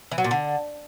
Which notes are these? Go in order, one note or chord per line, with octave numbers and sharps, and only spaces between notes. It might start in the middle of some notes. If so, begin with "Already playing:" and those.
E3
F#3
A#2
D3